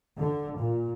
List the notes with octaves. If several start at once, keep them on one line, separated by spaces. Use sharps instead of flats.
D3
A#2